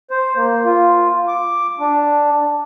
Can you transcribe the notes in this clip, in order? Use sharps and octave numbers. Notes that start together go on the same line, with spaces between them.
C5
A#3
F4
D6
D4